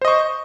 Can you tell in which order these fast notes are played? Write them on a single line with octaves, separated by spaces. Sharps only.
C5 D#5 C#6